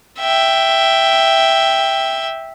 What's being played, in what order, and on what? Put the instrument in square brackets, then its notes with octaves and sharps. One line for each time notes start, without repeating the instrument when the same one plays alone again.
[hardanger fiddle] E5 G5